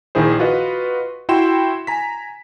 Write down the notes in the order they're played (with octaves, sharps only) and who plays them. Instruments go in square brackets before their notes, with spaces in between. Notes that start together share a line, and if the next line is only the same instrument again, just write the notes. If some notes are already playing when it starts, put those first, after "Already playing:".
[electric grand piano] A#1 D#3 E4 G#4 C5
F4 F#4 B4 D#5
E4 F#4 G5 C6 E7
G#5 A#5 B6